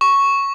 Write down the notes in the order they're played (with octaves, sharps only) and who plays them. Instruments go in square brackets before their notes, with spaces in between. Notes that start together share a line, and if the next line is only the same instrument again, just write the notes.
[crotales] C#6